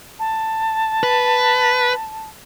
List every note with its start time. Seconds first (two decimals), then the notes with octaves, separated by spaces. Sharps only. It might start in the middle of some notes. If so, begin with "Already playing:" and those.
0.19 A5
1.03 B4